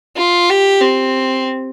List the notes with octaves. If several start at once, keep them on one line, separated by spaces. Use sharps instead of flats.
F4
G4
C4